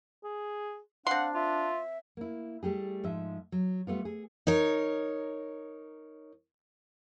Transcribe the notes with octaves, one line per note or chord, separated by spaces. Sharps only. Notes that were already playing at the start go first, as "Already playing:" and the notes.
G#4
C4 D4 F5 F#5 C6
F4 E5
A#3 E4
G3 A3 G4 G#4
G#2 F3 E5
F#3
G3 A3 B3 F4
G#4
D#4 A#4 C#5